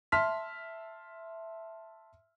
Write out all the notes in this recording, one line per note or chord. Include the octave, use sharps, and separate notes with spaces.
E5 A5 C6 F6 B6